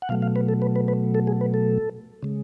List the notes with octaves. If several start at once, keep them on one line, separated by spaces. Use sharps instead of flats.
F#5
B2 F#3 A3 F5
F5
B4
A4
B4
B4
B4
A4
G#4
B4
A4
C#3 G#3